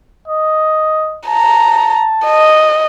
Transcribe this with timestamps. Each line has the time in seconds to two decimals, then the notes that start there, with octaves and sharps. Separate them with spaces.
0.28 D#5
1.28 A5 A#5
2.25 D#5